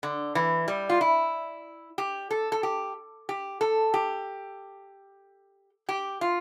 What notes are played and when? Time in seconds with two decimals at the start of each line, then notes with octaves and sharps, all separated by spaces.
0.03 D3
0.35 E3
0.68 G3
0.89 F4
1.01 E4
1.98 G4
2.31 A4
2.52 A4
2.63 G4
3.29 G4
3.61 A4
3.94 G4
5.89 G4
6.21 F4